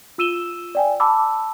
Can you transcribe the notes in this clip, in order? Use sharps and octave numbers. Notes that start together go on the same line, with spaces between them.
F4 E6 D#7 E7 G7
D5 G5 G#5
A5 B5 D6 E6